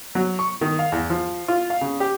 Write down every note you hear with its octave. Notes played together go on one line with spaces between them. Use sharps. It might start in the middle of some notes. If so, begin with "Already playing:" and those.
F#3
C#6
D#3
F5
E2
F3
F4
F5
C#3
G4